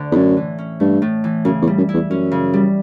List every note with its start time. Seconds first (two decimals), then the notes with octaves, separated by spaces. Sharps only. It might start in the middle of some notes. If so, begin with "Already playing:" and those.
Already playing: D2 D3
0.12 E2
0.16 F#2 A2
0.37 E3
0.58 C#4
0.80 G2 A3
1.02 A2
1.24 E3
1.45 F#2 C#3
1.62 E2
1.67 G3
1.78 F#2
1.89 E4
1.94 E2
2.10 F#2 C#4
2.32 C#3
2.54 G3